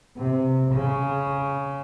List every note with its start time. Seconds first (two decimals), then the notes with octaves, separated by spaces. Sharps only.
0.17 C3
0.72 C#3